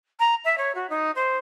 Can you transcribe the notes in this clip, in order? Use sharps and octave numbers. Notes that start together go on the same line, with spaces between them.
A#5
E5
C#5
F#4
D#4
C5